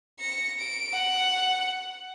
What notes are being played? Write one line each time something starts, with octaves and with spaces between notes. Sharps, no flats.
A#6 C#7
D7
F#5